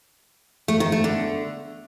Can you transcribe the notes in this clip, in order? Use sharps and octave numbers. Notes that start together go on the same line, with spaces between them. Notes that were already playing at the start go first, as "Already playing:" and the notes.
A3
D#3
A3
D3